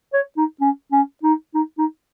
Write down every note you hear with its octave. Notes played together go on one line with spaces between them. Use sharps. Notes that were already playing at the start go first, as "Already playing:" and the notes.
C#5
D#4
C#4
C#4
D#4
D#4
D#4